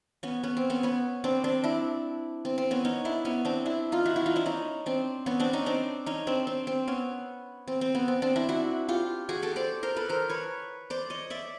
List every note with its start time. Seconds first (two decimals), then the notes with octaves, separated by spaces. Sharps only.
0.23 B3 C#4
0.43 B3 C#4
0.57 C4
0.70 B3 C#4
0.83 B3 C#4
1.24 C4 D4
1.44 C4 D4
1.64 D4 E4
2.45 C4
2.58 C4
2.71 B3 C#4
2.85 C#4 D#4
3.05 D4 E4
3.25 B3 C#4
3.45 C4 D4
3.66 D4 E4
3.92 D#4 F4
4.05 E4 F#4
4.16 E4 F#4
4.26 D#4 F4
4.36 D4 E4
4.46 C#4 D#4
4.86 C4 D4
5.26 B3 C#4
5.40 C4 D4
5.53 C#4 D#4
5.66 C4 D4
6.06 C#4 D#4
6.27 C4 D4
6.47 C4
6.67 C4
6.87 B3 C#4
7.67 C4
7.81 C4
7.95 B3
8.08 C4
8.22 C4 D4
8.36 D4 E4
8.49 E4 F#4
8.89 F4 G4
9.29 F#4 G#4
9.42 G4 A4
9.56 C5 D5
9.83 A#4 C5
9.96 A4 B4
10.09 A#4 C5
10.29 B4 C#5
10.90 C5 D5
11.10 C#5 D#5
11.30 D5 E5